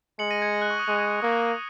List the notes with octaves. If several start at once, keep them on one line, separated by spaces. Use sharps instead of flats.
G#3 C#7 F#7
A#6 D#7
G#6 C#7
A#6
F#6
C#6
D#6
G#3 F#6
A#3 D#6
F#6
D#6